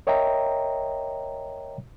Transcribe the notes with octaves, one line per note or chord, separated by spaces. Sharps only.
A#4 C#5 D#5 E5 G5 A#5